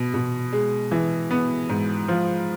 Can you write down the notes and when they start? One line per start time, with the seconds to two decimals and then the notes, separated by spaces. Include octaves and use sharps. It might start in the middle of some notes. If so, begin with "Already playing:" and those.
Already playing: B2
0.14 B2
0.52 G#3
0.91 E3
1.31 B3
1.69 G#2
2.08 F3